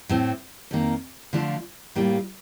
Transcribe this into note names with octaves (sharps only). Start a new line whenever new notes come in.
A2 A3 C4
F2 D#3 A#3
D3 F3 A3 D4 F4
A2 G3 A#3 F4